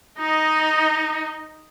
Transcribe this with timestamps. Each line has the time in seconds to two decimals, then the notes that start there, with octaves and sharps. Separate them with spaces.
0.19 D#4 D#5